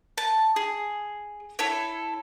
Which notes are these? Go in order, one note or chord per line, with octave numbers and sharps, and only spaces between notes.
A5
G#4
E4 A4 C#5